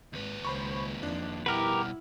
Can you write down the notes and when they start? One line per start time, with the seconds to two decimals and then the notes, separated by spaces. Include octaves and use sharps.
0.13 G#1 D#2 B4
0.45 C#2 C5 B5 C#6
1.03 F2 D#3 D4
1.46 B2 G3 E4 G4 A#4 B4 F#5 F6